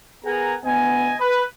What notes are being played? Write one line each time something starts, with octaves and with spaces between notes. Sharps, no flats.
B3 G#4 A#4 F#5 G#5 A#5
D2 B3 D#5 G#5
B4